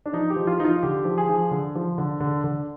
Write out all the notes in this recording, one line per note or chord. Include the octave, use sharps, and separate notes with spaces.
D4
F3 D#4
G4
F3
F4
F3 D#4
F4
D3 G4
F3
G#4
F3
D3
F3
D3
D3
D3